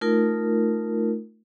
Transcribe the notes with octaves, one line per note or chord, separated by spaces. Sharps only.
A3 D#4 F4 A#4